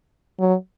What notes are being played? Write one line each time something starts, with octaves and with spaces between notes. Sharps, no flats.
F#3